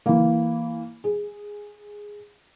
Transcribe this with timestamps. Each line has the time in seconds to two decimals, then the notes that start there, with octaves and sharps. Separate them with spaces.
0.06 E3 A#3
1.04 G#4